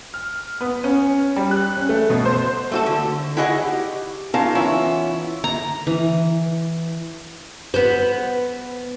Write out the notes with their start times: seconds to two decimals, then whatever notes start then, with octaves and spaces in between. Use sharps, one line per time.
0.14 F6
0.61 B3
0.84 C#4
1.36 G3
1.51 F#6
1.77 C#4
1.89 A3
2.10 B2
2.25 C5
2.72 A3 F#4 A4
2.86 D3
3.37 E4 F#4 G#4 D#5 F#5
3.62 G4
4.34 C#4 D#4 F4 A#4 F5 A5
4.55 E3 B3 C#4 E4 F4
5.44 A#5
5.87 E3
7.74 B3 C5